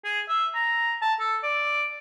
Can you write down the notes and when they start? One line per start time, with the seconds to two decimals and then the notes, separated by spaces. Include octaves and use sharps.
0.04 G#4
0.29 E5
0.55 A#5
1.02 A5
1.20 A4
1.43 D5